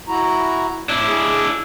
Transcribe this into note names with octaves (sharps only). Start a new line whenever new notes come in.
E4 F#4 A#5
A2 D4 E4
G#4